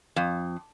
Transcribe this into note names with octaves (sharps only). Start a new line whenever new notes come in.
F2